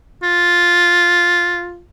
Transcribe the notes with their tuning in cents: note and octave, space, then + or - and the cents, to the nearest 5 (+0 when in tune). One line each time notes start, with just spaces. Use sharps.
F4 +5